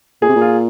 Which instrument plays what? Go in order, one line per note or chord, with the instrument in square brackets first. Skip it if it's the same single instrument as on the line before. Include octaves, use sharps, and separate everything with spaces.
[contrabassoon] A#2 [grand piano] G#4
[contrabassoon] C3
A#2
[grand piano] F4